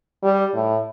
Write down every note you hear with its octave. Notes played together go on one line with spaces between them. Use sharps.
G3
A2